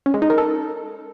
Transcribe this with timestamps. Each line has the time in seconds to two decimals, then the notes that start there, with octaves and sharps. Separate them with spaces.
0.06 C#4
0.14 G#3
0.22 D#4
0.30 A#4
0.38 A4